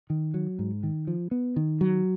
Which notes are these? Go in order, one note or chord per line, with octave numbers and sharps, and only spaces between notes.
D#3
F#3
G#2
D#3
F3
B3
D#3
F#3